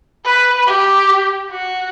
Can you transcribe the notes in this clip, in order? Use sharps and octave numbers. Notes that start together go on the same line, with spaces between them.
B4
G4
F#4